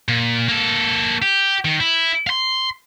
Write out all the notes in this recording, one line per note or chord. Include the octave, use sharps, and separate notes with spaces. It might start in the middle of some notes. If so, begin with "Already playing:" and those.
A#2
A#3 A4
G4
D#3
E4
F5 C6